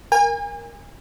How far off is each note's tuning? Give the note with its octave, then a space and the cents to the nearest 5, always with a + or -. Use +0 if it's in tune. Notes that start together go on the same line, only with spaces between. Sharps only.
A#4 +0 G#5 -40